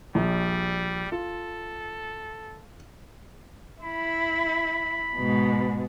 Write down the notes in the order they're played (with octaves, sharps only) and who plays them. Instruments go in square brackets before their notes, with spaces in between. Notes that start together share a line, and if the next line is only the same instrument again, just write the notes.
[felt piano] A#1 [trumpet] G3
[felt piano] F4 [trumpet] A4
[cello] E4 [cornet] B5
[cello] G#2 B2